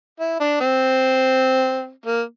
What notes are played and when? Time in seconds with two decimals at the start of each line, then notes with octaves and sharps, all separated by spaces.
0.19 E4
0.40 D4
0.60 C4
2.06 A#3